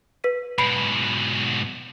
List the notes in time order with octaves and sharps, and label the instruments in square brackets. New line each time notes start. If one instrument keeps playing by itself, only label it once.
[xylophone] B4 B6 D#7
[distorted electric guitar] G#2 B2 [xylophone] B5 C7 D7